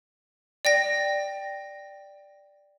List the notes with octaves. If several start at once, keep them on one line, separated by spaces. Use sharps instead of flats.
D5 G5 A#6